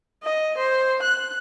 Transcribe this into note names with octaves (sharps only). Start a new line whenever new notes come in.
D#5
C5
F#6